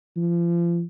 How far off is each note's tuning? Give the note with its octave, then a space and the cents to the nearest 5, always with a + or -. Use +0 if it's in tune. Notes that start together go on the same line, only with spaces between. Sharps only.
F3 -35